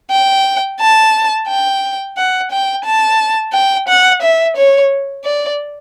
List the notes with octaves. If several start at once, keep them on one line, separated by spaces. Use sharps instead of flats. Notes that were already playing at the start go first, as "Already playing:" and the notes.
G5
A5
G5
F#5
G5
A5
G5
F#5
E5
C#5
D5